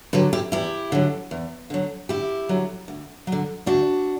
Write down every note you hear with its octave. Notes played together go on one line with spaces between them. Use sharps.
D3 F#3 G4 B4
E4 G4
E2 E4 G4
D3 F#3
E2
D3 F#3
D2 E4 G4
D3 F#3
D2
F#3
D3
D2 D4 F#4